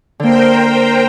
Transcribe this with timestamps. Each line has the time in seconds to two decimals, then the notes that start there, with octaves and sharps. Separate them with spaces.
0.20 D3 A#3 A#4 C5 G5